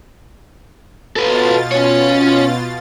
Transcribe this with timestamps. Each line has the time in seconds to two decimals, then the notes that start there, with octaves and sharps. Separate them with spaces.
1.16 B2 F4 A4 B4 A6
1.72 C#4 C#5